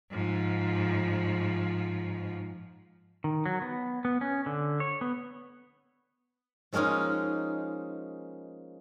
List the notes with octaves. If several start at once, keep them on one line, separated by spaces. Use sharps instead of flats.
G#2 F3
D#3
F#3
B3
B3
C#4
D3
C#5
B3
F3 G#3 A#3 C#4 D#4